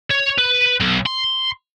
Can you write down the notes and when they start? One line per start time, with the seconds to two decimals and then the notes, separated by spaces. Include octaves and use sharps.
0.10 C#5
0.38 B4
0.80 B1
1.06 C6